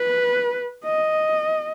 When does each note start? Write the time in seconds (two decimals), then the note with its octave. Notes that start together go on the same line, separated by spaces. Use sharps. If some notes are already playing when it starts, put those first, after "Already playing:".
Already playing: B4
0.85 D#5